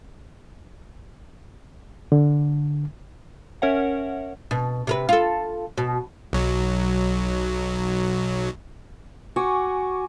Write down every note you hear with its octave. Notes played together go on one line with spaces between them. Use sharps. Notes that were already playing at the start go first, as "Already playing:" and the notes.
D3
C#4 A#4 C#5 E5 F#5
B2
C3 A#4 B4
F4 A4
B2
B1 F#3
F#4 G#5 C#6 D6